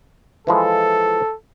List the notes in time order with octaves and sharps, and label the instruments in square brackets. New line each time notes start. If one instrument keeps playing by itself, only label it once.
[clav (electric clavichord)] E3 F3 G#3 [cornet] A4